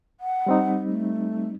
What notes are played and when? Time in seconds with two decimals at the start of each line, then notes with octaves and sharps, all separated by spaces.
0.20 F#5
0.46 G3 C4 D#4
0.87 A3